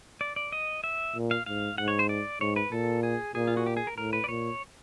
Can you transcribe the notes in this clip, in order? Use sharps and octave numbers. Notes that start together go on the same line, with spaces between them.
D5
D5
D#5
E5
A#2
F5
G#2 F5
G#2 F#5
C#5
C5
D5
G#2 C#5
B4
A#2 A4
G#4
A#2 G#4
F4
F#4
G4
G#4
A#4
A2 A#4
B4
D5
A#2 C#5